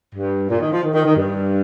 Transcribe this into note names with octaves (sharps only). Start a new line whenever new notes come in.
G2
A#2
D#3
F3
D#3
D#3
D#3
G2